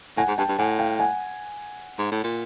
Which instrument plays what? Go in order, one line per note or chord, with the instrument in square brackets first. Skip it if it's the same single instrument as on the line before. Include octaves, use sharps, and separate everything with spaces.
[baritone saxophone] A2 [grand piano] F#5 G#5
[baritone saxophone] G#2
[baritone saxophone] G2 [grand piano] G5 A5
[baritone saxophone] G2
[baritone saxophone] A2 [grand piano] F#5 G#5
[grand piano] F5 G5
F#5 G#5
[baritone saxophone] G#2
A2
A#2